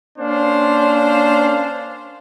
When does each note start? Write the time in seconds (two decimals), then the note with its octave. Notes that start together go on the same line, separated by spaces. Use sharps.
0.18 A#3 C#4 D4 C5 F5